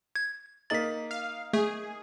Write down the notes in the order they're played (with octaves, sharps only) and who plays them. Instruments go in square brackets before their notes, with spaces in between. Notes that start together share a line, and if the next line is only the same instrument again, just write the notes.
[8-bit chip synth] G#6
[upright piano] A#3 D#4 F#7 [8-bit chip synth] A6 B6
[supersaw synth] F5
[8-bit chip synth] A3 [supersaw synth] G#4